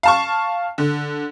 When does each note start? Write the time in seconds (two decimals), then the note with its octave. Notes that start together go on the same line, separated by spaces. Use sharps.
0.03 F5 A5 C#6
0.78 D3